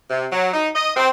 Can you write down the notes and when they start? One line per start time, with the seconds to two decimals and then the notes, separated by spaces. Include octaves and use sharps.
0.11 C3
0.32 F#3
0.54 D#4
0.75 D#5
0.96 C4